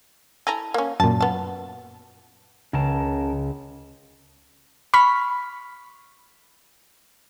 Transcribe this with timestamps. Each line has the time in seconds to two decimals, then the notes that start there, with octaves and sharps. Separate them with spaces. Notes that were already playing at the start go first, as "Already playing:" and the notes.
0.47 E4 A4 G#5 A#5
0.74 A#3 C#4
1.00 F#2 A#2 A5
1.21 B3 A5
2.73 C#2 C#3 A#4 A5
4.94 B5 C#6 F6 B6